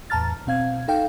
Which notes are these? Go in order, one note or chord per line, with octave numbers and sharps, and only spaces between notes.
E2 A2 A5 A#5 F6 A6
B2 C4 F5 G#6
D#4 A4 F5 G5